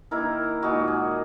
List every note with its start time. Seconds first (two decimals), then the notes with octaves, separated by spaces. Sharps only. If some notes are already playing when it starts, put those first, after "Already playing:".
0.11 D#3 A#3 E4 A#4
0.62 A#2 G#3 D#4 F#4
0.88 G#4